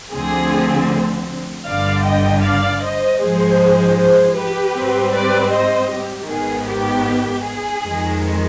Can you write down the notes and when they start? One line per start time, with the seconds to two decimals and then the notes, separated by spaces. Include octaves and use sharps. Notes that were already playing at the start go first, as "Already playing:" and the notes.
0.12 D2 D3 F3 C4 G#4
1.66 G1 G2 D3 D5 F5
2.04 D#5 G5
2.43 D5 F5
2.82 C5 D#5
3.20 G#2 F3 G#3 G#4 C5
3.97 G#4 C5
4.36 G4 B4
4.74 G#2 G3 C4
5.13 B4 D5
5.51 C5 D#5
5.90 G4
6.28 G#1 G#2 D#3 B3 G#4
6.67 G4
7.44 G#4
7.83 F2 D#3 G#3